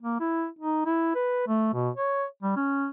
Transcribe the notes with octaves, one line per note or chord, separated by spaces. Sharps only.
A#3
E4
D#4
E4
B4
A3
B2
C#5
G3
C#4